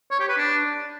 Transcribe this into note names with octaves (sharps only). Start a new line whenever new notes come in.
C#5
G4
B4
D4